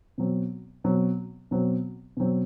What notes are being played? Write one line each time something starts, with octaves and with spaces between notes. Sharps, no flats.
B2 F#3 C4
B2 F#3 C4
B2 F#3 C4
B2 F#3 C4